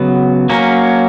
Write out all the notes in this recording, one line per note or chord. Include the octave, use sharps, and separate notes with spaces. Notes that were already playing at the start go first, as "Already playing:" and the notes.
Already playing: C#3 F#3 B3
F#3 A#3 C#4